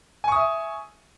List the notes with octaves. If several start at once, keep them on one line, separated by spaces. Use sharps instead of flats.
E5 G#5 C#6 D#6